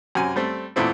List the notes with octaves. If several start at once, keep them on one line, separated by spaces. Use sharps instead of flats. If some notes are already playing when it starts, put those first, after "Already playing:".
F#2 C3 G#5
G3 A3 C4
E2 A#2 A3 C4 E4